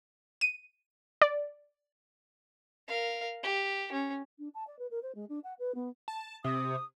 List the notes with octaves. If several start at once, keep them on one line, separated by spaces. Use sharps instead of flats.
D#7
D5
A#4 F5
G4
C#4
D4
A5
D5
B4
A#4
C5
G#3
D4
F#5
B4
B3
A5
C3 D#6